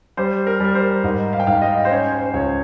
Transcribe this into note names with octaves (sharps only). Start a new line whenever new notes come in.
G3 C5
A#4
G3 A#4
C5
G#2 D#5
F5
G5
G#2 F5
D#5
C5
C#4 C#5
C5
C5
C#2 C#5